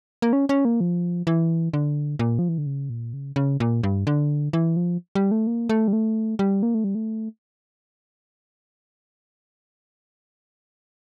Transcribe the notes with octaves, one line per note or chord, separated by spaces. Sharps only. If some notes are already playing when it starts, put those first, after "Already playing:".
A#3
C#4
C#4
A#3
F3
E3
D3
A#2
F3
E3
D3
C#3
A#2
C#3
C#3
A#2
G2
D3
E3
F3
G3
A3
A#3
A3
G3
A3
G3
A#3
A3
G3
A3